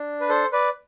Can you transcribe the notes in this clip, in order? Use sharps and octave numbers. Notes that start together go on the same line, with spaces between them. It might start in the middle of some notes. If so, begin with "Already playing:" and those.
Already playing: D4
B4
A4 C5
B4 D5